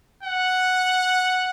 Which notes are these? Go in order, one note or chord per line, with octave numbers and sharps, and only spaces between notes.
F#5